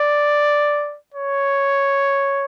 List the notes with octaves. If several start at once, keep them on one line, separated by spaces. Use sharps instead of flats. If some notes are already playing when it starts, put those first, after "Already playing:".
Already playing: D5
C#5